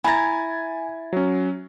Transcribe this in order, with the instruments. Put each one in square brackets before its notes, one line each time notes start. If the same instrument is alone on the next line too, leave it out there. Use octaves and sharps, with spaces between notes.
[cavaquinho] E4 A#5 [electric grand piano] G#5 G#6 A6
[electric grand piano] F#3 C#4